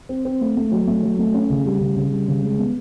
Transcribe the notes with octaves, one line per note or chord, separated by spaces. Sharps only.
C4
C4
A3
A3
F#3
A3
F#3
A3
C#4
C#3
G3
C#3
C#3
G3
C#3
G#3
B3